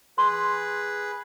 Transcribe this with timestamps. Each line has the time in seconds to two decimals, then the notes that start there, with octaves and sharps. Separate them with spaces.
0.18 G#4 B4 C6